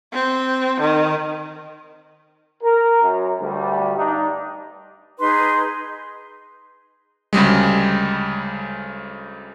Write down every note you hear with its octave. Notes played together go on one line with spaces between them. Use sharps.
C4
D#3
A#4
F#2
D2 G3
G2 D4 D#4
D#4 G#4 B4 C6
D2 C#3 G3 G#3